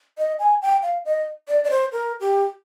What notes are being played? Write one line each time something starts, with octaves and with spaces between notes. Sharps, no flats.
D#5
G#5
G5
F5
D#5
D5
D5
C5
A#4
G4